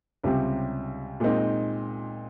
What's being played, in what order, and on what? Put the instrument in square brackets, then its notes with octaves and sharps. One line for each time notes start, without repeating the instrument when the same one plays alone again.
[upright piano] C#2 C3 G3 C4
A#2 G#3 C4 D#4